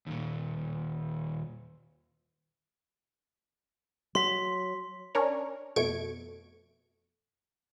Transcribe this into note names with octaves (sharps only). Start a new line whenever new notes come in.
D#2 A#2
F#3 C6 B6
C#4 D4 A#4 C#5
F2 B2 A3 C#6 G#6 D7